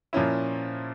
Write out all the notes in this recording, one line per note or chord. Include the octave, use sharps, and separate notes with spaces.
A#2 F3 A#3 C#4 E4